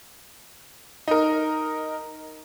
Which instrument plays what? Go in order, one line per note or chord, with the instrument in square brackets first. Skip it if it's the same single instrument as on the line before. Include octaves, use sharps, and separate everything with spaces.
[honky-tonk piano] D#4 A#4